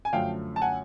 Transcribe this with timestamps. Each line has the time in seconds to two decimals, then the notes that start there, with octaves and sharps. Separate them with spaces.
0.05 G#5
0.13 F#2 D3 F3 A3 F5 G5
0.56 A5
0.62 F#5 G#5